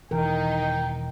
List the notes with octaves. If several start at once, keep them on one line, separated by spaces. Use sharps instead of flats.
E1 D#3 E3 D#4 A#4 G5